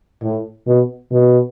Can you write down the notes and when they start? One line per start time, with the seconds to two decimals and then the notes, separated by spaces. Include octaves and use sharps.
0.23 A2
0.67 B2
1.11 B2